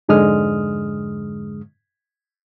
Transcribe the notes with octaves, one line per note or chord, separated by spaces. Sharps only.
F2 G#2 D3 G#3 D#6 F6